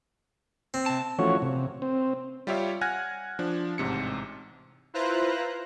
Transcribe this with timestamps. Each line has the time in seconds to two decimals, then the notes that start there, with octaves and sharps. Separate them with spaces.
0.74 C4
0.86 C3 A5
1.19 E3 F3 A3 C#4 F#4 C#5
1.42 C3
1.82 C4
2.47 G3 F4 G4 C#5 E5 F5
2.81 F#5 G#5 F6 F#6 G#6 A#6
3.39 F3 D4
3.78 A1 G#2 C3 C#7
4.94 E4 F4 B4 C5 A#5 F#6